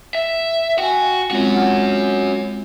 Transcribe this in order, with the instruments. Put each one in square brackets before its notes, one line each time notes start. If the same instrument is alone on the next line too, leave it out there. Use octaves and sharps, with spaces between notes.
[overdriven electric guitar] E5
[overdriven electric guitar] F#4 [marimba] G5 G#5
[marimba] G#3 C4 F4 [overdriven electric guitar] C#4 F#4
[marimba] F#5 F6